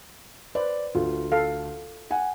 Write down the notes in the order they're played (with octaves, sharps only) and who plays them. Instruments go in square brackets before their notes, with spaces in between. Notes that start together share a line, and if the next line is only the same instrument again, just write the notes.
[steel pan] B4 C5 [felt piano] D5
[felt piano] D2 [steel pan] F4
[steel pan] A4 F5
[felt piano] F#5 G#5